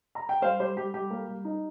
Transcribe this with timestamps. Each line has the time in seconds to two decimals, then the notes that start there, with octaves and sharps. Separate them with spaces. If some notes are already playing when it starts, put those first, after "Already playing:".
0.15 A#5
0.29 G5
0.42 G3 C5 F5
0.59 G3 G4 C5
0.76 G3 G4
0.94 G3 G4
1.10 A#3
1.28 G3
1.45 D#4